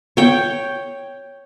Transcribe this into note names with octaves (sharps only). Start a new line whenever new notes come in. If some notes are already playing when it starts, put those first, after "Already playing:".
C#5 G5